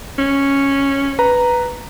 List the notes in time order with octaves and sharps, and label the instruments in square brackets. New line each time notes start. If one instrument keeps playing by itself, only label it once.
[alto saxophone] C#4
[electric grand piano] B4 A#5